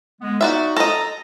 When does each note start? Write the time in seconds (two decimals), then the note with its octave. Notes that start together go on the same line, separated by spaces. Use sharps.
0.21 D3 G#3 B3
0.41 D#4 F#4 D5 E5
0.77 A4 D#5 A#5